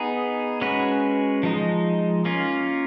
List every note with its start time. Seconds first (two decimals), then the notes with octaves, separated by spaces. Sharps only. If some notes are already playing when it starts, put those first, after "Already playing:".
Already playing: B3 D#4 G#4
0.61 G#3 C#4 F#4 B4
1.43 F3 G#3 D#4
2.25 A#3 C#4 F4